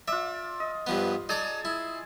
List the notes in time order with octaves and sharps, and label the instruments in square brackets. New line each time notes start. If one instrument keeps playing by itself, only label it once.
[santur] F4 D5 [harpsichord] E5
[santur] D#5
[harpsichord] G2 F3 B3
[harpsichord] D#4 D5 D6 [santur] G#4 G#5 A5
[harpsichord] E4